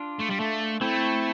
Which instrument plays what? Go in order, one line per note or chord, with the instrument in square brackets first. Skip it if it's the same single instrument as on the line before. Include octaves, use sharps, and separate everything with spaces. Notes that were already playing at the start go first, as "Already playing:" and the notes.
Already playing: [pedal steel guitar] D4 F4
[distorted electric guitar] A3
G3
A3
[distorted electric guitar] A3 [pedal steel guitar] C4 E4